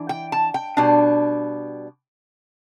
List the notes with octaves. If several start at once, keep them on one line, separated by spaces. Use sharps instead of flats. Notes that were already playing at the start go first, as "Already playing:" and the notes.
Already playing: E3 D4
G5
A5
G5
B2 G3 D4